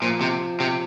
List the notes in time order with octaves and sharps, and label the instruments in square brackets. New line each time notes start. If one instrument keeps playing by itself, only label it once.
[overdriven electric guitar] A#2 [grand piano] F3
[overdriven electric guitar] C3
C3